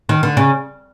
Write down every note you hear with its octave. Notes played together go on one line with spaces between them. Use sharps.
D#3
D3
C#3